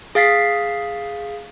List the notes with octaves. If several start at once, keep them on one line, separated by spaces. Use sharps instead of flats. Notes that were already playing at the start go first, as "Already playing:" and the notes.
G#4 F5 A6 B6 C7